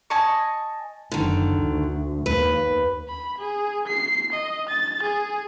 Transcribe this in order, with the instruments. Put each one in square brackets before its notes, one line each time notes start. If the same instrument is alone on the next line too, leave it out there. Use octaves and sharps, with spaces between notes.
[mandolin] D#5 G#5 A5 C#6
[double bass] F#1 [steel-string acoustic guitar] D3 D#3
[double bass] D2
[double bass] D#2 [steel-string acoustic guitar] B4
[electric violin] B5
G#4
C7
D#5
A6
G#4